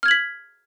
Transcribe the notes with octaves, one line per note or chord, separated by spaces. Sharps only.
F6 G#6 B6 F#7